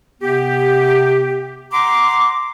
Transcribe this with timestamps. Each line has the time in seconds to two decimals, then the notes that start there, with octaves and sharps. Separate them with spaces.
0.22 C3 B3 G4
1.73 F#5 A#5 C6 D6